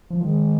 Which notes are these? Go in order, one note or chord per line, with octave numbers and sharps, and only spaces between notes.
F3
D#3 G#3